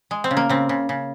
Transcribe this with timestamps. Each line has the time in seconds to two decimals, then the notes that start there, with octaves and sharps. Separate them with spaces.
0.11 G#3
0.24 C4
0.31 C#3
0.37 A#3
0.49 C#3 C4
0.69 C#3
0.89 C#3